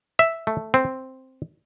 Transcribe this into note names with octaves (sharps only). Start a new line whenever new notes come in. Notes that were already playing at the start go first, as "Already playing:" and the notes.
E5
A3
C4